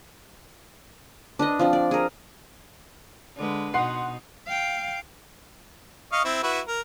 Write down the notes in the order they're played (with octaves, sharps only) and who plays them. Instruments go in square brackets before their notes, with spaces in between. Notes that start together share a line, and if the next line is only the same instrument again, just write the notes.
[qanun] D4 B4 D#5
F3 C4 D4
D5
G#4 A#4
[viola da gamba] D3 G#3 B4
[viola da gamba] B2 D#4 [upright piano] F#5 C6 C7
[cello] F5 G5
[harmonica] D#5 F5 C#6
C4 E4
E4 F#4 B4
A#4